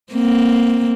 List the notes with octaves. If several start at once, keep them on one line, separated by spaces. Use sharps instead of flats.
A#3 C4